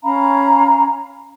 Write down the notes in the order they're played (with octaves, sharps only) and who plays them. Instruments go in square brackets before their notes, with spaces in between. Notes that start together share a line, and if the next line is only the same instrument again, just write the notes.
[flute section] C#4 F5 A#5 B5